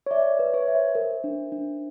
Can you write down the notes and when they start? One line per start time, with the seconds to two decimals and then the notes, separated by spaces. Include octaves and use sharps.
0.06 C#5
0.11 D5 E5
0.33 C#5
0.39 B4
0.54 C#5
0.68 E5
0.75 C5
0.95 A#4
1.24 D4
1.52 D4